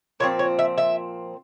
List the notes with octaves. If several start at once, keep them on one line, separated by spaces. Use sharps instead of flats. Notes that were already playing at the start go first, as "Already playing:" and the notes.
A#2 F3 C4 C#5
C#5
E5
E5